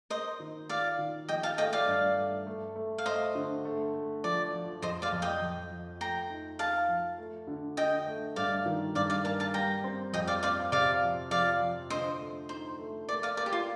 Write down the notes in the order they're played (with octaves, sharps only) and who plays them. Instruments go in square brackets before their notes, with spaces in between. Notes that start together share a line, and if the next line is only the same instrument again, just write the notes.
[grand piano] A#3 [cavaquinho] C5 D#5
[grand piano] D#3
[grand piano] F4 [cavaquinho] D5 F5
[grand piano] D#3
[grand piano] F3 [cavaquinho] D#5 G5
[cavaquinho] F5 A5
[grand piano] A3 [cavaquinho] D#5 G5
[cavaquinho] D5 F5
[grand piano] G2
A3
A3
A3
[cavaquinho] F5
[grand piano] A3 [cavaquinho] C5 D#5
[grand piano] D3
A3
A3
[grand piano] F3 [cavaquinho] D5
[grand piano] F3
[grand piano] F2 [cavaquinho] C5 D#5
[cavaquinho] D5 F5
[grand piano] F2
[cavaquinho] D#5 G5
[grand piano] F2
F3
[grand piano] A3 [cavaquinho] G5 A#5
[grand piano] D#4
[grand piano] D#4 [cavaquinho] F5 A5
[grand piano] F3
A3
D3
[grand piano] D3 [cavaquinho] D#5 G5
[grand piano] A3
[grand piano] G2 [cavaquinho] D5 F5
[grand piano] D#3
[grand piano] G2 [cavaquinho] D5 F5
[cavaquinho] D5 F5
[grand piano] A#3 [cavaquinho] F5 A5
[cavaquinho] F5 A5
[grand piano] G3 [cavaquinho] G5 A#5
[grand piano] C4
[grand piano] F2 [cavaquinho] D#5 G5
[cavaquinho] D5 F5
[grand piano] C4 [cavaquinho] D5 F5
[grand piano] C3 [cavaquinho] D5 F5
[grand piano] F3
[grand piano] F3 [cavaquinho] D5 F5
[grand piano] F3
[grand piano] D3 [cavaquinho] C5 D#5
[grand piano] A3
[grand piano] D#4 [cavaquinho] C5
[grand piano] A3
[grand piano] A#3 [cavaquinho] D5
[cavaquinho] D5 F5
[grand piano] A#3 [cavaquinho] D5
[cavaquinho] G4
F4